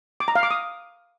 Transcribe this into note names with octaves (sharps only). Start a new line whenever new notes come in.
D6
A#5
F5
D6
D#6